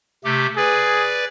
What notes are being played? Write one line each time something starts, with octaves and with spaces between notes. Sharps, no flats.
C3 A3 G4
G#4 B4 D5